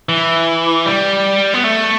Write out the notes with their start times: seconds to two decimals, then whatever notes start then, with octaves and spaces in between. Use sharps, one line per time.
0.09 E3
0.86 G3
1.54 B3
1.64 A3